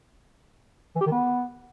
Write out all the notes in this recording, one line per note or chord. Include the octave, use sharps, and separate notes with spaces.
E3
G4
D#3
B3